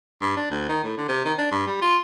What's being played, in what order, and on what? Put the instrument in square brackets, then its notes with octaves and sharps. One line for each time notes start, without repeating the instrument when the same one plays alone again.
[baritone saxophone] G2
D4
D2
D#3
A2
D3
C3
D#3
D4
G2
G3
F4